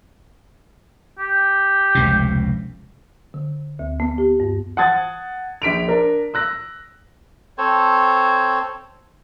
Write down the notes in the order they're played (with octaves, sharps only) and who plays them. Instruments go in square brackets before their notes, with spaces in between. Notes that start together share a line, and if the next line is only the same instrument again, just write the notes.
[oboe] G4
[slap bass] F1 C#2 B2
[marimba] D3
D2
B3
G4
G2
[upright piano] F#5 A5 D#6 G#6 A6
A#1 B6 D7 F7
D4 A#4
E6 F#6 A#6
[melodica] C4 A4 C5 C#5